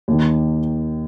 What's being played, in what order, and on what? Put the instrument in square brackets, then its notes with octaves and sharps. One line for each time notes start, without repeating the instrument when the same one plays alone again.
[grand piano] D#2 D#3